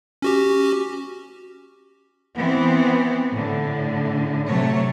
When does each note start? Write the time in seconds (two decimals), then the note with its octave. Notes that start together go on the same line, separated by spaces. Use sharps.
0.22 C#4 F#4 G4
2.36 E3 B3 C4
3.31 A2 D3
4.47 C3 F#3 A3 C#5